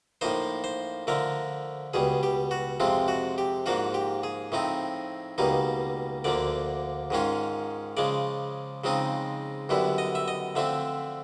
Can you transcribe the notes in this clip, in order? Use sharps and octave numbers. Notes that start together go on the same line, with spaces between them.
A2 F3 A#3 D#4 C5
C5
D3 F3 A3 A#4
C#2 B2 G3 G#4
G4
F#4
F2 C3 F3 G#3 C4 F4
F#4
G4
G#2 F3 A#3 D4 F4 F#4
G4
G#4
A2 F3 A3 C4 D#4
C#2 B2 G3 A#3 D#4
D2 D3 F3 A#3 D5
G#2 D#3 G#3 C#4 F4
C#3 F3 G#3 D5
C#3 F3 G#3 C4 D#4
F#2 D3 G3 B3 E4
D#5
E5
D#5
D3 F3 A3 C4 E5